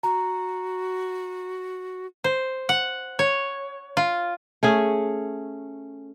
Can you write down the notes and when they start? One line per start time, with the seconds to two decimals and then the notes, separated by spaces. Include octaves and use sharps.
0.03 F#4 A#5
2.24 C5
2.69 F#5
3.19 C#5
3.97 F4
4.63 A3 C#4 G#4